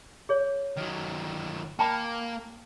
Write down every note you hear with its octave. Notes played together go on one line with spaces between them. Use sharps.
G#4 C#5
D#3 F#3
A#3 G5 A5 B5